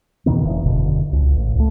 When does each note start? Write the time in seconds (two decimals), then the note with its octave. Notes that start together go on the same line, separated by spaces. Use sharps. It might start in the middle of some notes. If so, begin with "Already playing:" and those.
0.26 E2 B2 D#3 B3
0.45 F1 E2
0.65 F#1 B2 D3
1.13 C#2
1.36 A1
1.55 C#2 A3